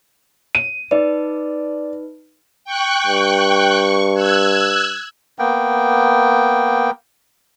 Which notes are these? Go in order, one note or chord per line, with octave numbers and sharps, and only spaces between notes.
D#7
D#4 B4 D5
G5 C#6 F#6
G2
C#6
E6 F#6 G#6
A#3 B3 G5